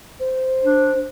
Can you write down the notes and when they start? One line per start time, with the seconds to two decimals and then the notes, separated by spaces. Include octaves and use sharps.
0.19 C5
0.64 D4